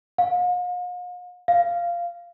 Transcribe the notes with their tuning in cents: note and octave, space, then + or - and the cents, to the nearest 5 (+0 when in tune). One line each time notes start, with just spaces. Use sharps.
F5 +45
F5 -10